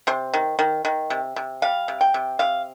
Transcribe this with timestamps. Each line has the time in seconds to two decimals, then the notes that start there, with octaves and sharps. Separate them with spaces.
0.07 C3 C5
0.33 D#3
0.59 D#3
0.85 D#3
1.10 C3
1.36 C3
1.62 G3 F5
1.88 C3
2.01 G5
2.14 C3
2.39 C3 F5